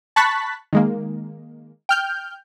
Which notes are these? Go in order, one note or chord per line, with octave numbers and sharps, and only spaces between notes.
A5 B5 C#6 F#6 A6 B6
D#3 G#3 A#3
G5 F6 G6